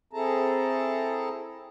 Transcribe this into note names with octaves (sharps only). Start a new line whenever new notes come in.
C4 E4 G#4 A4 A5 A#5